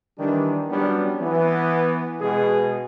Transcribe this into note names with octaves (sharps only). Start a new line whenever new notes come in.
D#3 E3 G3 D4
F#3 G3 B3 C#4 D4
E3 B3
B2 G#3 B3 G#4